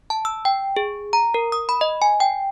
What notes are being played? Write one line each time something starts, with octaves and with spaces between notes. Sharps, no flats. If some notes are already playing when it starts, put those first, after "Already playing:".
A5
E6
G5
G#4
A#5
A#4
D#6
B5
D#5
G#5
G5